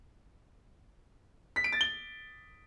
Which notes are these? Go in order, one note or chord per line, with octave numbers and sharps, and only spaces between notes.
B6
D7
A6
G7